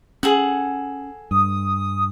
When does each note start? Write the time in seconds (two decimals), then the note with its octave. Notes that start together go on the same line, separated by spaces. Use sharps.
0.23 C#4 G#4 A4 F#5
1.31 G2 D#6